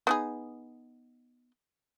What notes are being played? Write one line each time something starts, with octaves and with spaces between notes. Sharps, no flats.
B3 D#4 G#4